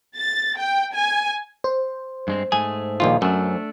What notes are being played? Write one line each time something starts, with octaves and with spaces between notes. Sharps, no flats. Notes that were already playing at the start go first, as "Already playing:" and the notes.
A6
G5
G#5
C5
G2 G#3 C4
G#2 A3 G#4 G#5
A#1 D#2 F4
F#2 A3 D4